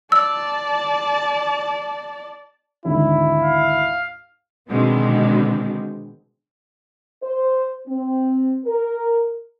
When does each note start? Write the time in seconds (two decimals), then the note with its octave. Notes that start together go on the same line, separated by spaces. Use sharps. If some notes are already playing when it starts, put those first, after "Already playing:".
0.12 D5 A5 E6
2.85 G#1 D2 G#2 E4
3.43 F5
4.69 B2 D3 D#3 G#3 B3 C4
7.23 C5
7.88 C4
8.66 A#4